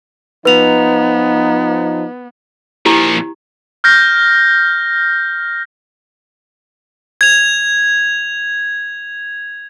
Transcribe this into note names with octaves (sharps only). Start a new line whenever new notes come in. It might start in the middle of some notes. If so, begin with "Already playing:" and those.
F3 B3 D#4 B4 F7
A#2 F3 E4 G4
F6 G6 A#6
G#6 F7